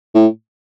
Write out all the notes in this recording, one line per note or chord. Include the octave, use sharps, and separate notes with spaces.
A2